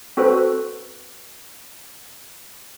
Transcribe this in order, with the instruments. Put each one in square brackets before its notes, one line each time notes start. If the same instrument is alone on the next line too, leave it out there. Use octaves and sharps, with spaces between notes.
[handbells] C4 F#4 A4 B4 C5